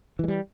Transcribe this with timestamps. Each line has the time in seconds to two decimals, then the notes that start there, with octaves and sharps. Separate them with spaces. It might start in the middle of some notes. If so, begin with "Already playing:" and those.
0.19 E3
0.24 G#3
0.28 G3